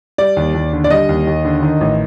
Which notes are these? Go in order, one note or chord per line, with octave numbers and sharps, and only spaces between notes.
G3 D5
D#2
D#2
D3
D5
G3 D#5
D#2
D#2
D3
D#3
A1